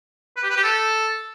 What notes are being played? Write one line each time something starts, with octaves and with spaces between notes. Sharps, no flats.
B4
G4
B4
G4
A4